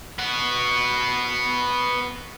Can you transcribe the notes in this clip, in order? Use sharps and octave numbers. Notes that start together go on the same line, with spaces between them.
B3 F#4